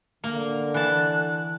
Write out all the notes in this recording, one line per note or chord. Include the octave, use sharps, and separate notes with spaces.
D3 A#3
E3 A5 F#6